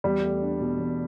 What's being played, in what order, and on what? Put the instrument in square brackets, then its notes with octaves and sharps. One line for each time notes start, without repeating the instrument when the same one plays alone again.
[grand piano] E2 [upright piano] G3
[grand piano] A3
D4
B2
E2